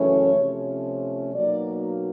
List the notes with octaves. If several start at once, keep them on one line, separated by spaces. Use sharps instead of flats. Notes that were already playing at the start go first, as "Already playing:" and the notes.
Already playing: F#2 C#3 E3 A3 C#4 C#5
C3 F3 A3 C#4
B2 F#3 A#3 D#4 D5